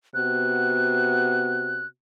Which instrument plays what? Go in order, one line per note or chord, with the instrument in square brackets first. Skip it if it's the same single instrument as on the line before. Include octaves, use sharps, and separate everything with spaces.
[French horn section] C3 B3 F#4 [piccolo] F#6